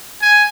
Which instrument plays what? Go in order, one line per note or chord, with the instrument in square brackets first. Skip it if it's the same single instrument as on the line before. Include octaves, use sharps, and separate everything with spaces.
[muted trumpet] G#5